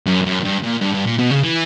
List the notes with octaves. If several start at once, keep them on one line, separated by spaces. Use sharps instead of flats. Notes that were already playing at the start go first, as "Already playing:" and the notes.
F#2
F#2
G2
A#2
G2
G2
A#2
B2
C#3
E3